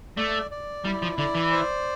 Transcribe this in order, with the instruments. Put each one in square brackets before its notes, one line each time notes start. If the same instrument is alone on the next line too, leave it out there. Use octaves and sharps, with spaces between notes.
[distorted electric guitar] A3 [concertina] D5
[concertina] D5
[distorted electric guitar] G3 [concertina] E4
[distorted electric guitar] F3
[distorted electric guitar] D3 [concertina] D5
[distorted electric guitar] E3
[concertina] C5